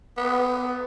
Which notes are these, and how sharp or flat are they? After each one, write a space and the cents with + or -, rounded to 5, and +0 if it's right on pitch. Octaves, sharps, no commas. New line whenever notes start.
B3 +20